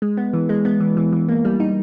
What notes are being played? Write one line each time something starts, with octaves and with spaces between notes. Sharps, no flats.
G#3
B3
E3
G#3
B3
E3
E3
E3
A#3
G3
D#4